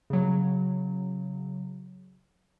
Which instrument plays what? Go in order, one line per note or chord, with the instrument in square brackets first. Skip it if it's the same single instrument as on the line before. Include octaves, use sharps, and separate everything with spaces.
[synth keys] C#3 F#3